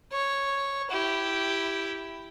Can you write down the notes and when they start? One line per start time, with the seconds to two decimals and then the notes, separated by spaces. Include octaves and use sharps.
0.12 C#5
0.91 E4 G4